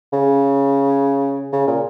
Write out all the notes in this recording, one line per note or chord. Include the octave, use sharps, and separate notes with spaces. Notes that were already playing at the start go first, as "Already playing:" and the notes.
C#3
C#3
A#2